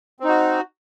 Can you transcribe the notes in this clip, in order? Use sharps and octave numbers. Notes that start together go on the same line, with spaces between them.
C4 D#4 F#4